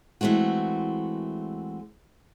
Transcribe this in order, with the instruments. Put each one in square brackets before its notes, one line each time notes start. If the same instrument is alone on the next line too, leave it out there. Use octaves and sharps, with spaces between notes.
[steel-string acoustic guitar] E3 G#3 A3 C4 F#4